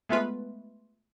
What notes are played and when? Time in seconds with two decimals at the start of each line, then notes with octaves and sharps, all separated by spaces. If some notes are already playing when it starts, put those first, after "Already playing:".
0.09 G#3 A3 B3 F4 B4